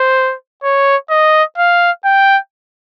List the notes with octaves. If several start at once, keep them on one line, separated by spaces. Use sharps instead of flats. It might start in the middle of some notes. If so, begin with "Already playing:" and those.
Already playing: C5
C#5
D#5
F5
G5